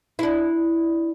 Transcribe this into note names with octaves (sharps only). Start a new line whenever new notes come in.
D4 E4